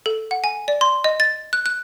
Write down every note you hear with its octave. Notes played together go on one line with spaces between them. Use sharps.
A4
F#5
G#5
D5
C6
D#5
A6
F#6
F#6